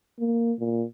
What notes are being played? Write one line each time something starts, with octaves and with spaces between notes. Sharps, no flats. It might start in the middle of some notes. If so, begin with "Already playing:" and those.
A#3
A#2